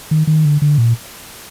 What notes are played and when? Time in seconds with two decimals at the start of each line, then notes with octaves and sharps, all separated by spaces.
0.11 D#3
0.27 D#3
0.45 D3
0.62 D3
0.78 A#2